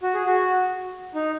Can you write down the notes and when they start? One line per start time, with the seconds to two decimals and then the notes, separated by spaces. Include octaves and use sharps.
0.03 F#4
0.14 G#4
0.26 F#4
1.15 D#4